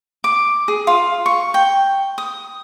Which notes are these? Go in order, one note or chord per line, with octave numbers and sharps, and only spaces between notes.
D6
G#4
F4
C#6
G5
D#6